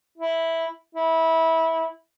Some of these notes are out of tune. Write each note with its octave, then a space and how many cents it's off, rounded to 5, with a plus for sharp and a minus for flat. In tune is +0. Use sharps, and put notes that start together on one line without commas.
E4 -5
E4 -20